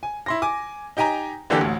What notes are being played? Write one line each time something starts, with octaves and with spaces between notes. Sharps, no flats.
G#5
E4 C6 A#6
G#5 D6
D#4 G4 G5 G#5 A#5
D3 E3 A#3 D4 G4 A4
A1 D2